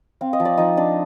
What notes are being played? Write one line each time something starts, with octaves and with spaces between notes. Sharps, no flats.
C4 F5
D#5
F3
D5
F3 D#4 D#5
D4